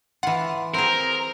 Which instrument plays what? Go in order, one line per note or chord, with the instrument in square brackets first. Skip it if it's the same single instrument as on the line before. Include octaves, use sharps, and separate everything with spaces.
[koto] E3 F4 [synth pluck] F#5
[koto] C4 G#4 [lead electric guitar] A#4 [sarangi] A#5